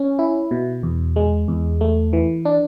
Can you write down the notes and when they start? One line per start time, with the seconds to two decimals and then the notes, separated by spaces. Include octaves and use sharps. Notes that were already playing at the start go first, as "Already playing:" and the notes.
Already playing: C#4
0.19 E4
0.51 B2
0.83 E2
1.16 G#3
1.48 E2
1.81 A3
2.13 E3
2.45 D4